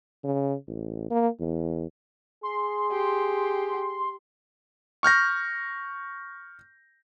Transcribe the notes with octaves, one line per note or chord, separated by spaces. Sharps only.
C#3
A1
A#3
E2
G#4 C6
G4
C#6 F6 G6 A#6